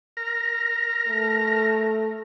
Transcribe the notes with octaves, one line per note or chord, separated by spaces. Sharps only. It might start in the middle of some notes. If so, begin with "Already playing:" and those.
A#4 A#5 F6
A3